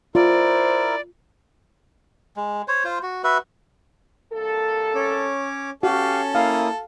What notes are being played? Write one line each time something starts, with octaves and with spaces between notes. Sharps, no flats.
E4 F4 A#4 C5 D5
G#3
C5 C#5
F4 C5
F#4
F#4 B4 E5
C2 A#3 A4
C#4 C#5 D6
C#4 F#4 G4 A4 F5
A#3 E4 F5 D#6